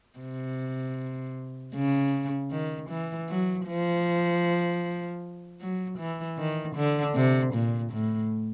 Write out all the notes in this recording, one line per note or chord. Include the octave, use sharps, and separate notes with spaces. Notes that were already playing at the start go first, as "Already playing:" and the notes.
C3
C#3
D#3
E3
F#3
F3
F#3
E3
D#3
D3
C3
A#2
A2